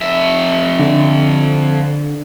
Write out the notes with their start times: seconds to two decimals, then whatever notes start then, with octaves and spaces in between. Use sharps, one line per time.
0.01 F2 E5
0.79 D3